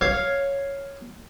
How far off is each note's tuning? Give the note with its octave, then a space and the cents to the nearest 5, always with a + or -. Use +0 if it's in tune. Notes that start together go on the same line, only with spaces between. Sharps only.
C#5 +0 F5 +0